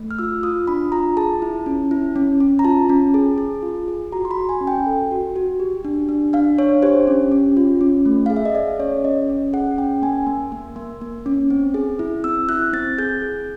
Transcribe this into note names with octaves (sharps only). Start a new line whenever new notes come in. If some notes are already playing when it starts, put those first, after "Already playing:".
Already playing: A3
F6
F4 E6
F4 D#6
D4 B5
F4 A#5
G#4 A5
E4
C#4
E4
C#4
C#4
A#5
F4 A5
C#4
G#4
G#4
F4
G#4
F#4 A#5
C6
B5
F#4
G#5
C#4
G5
A4
F#4
F#4
G4
D4
D4
D4 F5
D4 C#5
G4 C5
C#4
C#4
F4
C#4
A3
G#4 F5
E5
D#5
G#4 D5
C#4 C#5
C#4 D#5
C#4
G#4 F#5
C#4 G5
A#3 G#5
A#3
A#3
A#3
A#3
C#4
C4
G#4
E4
C4 E6
E4 F#6
C4 A6
G#4 G6
G#4